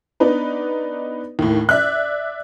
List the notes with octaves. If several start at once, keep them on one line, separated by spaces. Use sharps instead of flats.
B3 D4 D#4 B4
D#2 A2
D5 E5 F#6